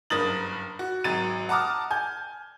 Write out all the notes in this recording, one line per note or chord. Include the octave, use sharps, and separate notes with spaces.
F#1 G2 A#4 D#6 A6 F#7
F#4
G#1 F#3 A6 D#7
F#5 A5 A#5 D6 D#6 F6
G#5 G6